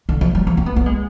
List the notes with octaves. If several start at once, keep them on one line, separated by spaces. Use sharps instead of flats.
D3
F3
G3
F3
C4
B3
B3
G#3